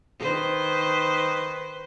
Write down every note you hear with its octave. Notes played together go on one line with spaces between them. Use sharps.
D#3 B4 C5